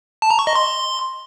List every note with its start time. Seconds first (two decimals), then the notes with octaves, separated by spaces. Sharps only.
0.22 A5
0.30 A#5
0.39 C#6
0.47 D#5
0.55 C6